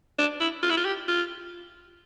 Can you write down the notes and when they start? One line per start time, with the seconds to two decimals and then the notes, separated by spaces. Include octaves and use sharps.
0.19 D4
0.40 E4
0.63 F4
0.70 E4
0.77 F4
0.85 G4
1.08 F4